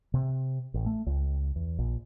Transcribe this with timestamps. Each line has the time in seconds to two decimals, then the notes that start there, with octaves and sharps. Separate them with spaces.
0.14 C3
0.74 A1
0.86 A3
1.06 C#2
1.56 E2
1.79 A#1